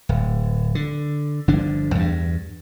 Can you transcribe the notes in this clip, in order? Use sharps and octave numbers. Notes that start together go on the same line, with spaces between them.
D1
D3
G1 D3 F3 D4
E2 G2